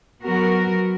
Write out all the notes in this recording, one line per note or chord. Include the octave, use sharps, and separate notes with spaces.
F#3 B3 F#4 A#4